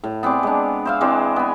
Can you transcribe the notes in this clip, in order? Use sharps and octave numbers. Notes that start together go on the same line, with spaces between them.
A2
B3 C4 G#4 D5
G#3 D4
C5 E5 F5
E3 G#3 C4 D5
B3 G#5